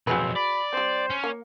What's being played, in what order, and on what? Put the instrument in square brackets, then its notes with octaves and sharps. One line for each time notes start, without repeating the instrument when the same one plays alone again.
[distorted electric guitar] B1 F2 [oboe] C4 [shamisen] F#4 G#4 B4
[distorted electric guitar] D5 [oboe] B5
[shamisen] G3 C4 [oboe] C5
[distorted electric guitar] C#4
[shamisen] A#3